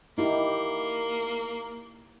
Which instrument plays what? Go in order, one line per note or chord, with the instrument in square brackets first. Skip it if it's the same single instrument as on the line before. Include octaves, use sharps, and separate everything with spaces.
[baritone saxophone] A#3 [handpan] D#4 E4 G4